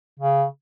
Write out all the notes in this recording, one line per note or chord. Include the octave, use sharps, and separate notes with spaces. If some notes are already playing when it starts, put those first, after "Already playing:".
C#3